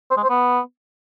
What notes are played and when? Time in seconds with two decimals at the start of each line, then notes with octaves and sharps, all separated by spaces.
0.11 C5
0.17 G#3
0.23 C5
0.30 B3